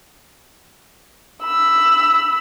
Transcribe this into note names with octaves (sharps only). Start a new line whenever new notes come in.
B5 E6